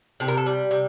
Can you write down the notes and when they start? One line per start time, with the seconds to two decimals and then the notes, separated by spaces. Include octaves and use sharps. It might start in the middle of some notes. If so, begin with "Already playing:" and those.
0.20 C3 A4
0.28 A#4
0.37 A4
0.46 G3
0.71 C3